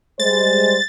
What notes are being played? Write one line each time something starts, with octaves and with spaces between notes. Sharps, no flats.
G3 G#3 C5 A6